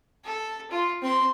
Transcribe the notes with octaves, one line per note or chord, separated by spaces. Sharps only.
A4
F4
C4 C6